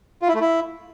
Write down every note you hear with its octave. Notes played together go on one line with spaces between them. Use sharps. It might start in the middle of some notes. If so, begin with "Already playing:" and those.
F4
E4
A3
E4